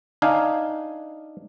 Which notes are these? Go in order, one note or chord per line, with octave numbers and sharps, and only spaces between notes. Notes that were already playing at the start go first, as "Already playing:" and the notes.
D4 D#4 F5 G#5